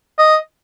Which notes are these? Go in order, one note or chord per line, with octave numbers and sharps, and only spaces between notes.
D#5